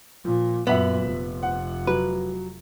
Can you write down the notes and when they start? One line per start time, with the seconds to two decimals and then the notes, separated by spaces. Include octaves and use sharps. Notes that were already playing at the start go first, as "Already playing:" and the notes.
0.25 A#2 F3
0.67 F#2 A#2 B3 E5 F#7
1.03 F1
1.43 F#5
1.87 F#3 B4